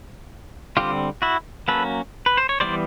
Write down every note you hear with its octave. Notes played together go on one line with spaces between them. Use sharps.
D3 G3 C4 F4 G4
E4 F#4
F#3 A#3 C#4 A4 B4
B4
C5
C#5
E3 G3 B3 C5 D5